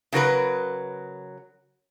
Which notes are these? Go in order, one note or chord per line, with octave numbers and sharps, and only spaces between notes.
C#3 F#3 A#4 B4